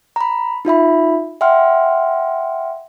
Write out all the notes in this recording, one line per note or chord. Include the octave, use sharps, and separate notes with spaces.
A#5 B5
D#4 F4 E5 B5
E5 F#5 G5 C6 F6